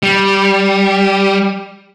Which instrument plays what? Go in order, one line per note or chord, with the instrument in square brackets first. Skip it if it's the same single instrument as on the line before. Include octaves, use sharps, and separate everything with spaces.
[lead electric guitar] G3